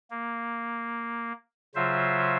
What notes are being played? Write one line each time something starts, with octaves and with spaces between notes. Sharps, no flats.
A#3
C#3 F#3 F4 C5 E5